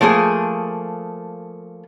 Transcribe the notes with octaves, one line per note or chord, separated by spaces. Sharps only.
F3 A3 A#3 G#4